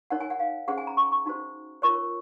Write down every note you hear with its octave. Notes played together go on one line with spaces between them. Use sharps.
D#4 A#4 C#5 F#5
G#5
F#5
F5
C#4 G#4 C5 F#5
G#5
A#5
C#6
C#6
D#4 F#4 C5
F4 A#4 C#5 C#6